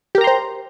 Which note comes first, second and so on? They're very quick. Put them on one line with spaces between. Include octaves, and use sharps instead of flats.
G4 A#4 A#5 C6 C5